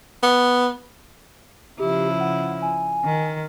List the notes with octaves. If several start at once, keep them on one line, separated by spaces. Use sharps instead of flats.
B3
C#3 F3 E4 G4
F#5
G#5
D#3